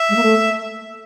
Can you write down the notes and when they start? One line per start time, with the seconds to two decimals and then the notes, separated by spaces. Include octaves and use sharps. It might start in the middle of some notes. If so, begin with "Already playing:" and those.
Already playing: E5
0.10 G#3
0.16 A#3
0.23 A3